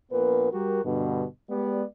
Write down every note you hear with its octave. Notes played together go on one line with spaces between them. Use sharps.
A#1 A#2 B3 A#4 B4
G3 F#4 G4 A#4
G2 B2 D3
G#3 B3 G4 D5